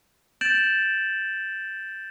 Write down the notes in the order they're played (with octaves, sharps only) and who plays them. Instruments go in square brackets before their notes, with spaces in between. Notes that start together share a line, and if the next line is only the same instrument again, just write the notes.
[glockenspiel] G6 A6 D7 E7 F#7